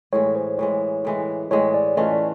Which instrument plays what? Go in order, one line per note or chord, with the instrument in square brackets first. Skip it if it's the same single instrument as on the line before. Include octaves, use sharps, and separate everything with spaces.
[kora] A2 E3 G#3 [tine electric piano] C#5
[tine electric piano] C5
[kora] A2 E3 G#3 [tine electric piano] C#5
[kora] A2 E3 G#3
[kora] A2 E3 G#3 [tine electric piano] C#5
[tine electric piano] D5
[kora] E3 A3 C#4 F4 [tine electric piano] D#5
[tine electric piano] D5